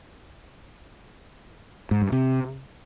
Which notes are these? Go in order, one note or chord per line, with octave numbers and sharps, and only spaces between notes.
G#2
G2
C3